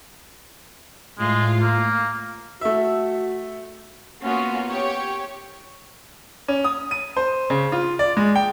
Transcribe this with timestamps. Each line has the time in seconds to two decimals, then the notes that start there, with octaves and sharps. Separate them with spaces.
1.19 A2 G#3 F4
1.62 A#3
2.61 A3 F#4 E5
4.24 A#3 B3 C#4 F4 F#4
4.69 G4 C#5
6.48 C#4
6.64 D#6
6.91 D#7
7.17 C5
7.50 C#3
7.72 F4
7.99 D5
8.17 G#3
8.35 G5